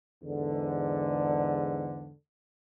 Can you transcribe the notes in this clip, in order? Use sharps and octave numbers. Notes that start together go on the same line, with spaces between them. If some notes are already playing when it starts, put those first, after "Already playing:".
E2 G#2 D3